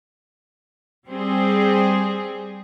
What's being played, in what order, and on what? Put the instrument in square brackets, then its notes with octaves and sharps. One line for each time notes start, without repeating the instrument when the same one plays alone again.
[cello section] G3 C4 G#4